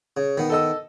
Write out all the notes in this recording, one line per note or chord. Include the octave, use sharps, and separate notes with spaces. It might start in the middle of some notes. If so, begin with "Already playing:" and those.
C#3
D#3 B3
A4 D#5 E6